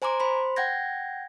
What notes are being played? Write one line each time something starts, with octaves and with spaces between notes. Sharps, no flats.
C5 G#5 A#5 C6 D6
C5 B5 C6
F#5 G5 G6 G#6 A#6